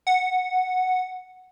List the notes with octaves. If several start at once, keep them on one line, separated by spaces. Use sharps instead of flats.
F#5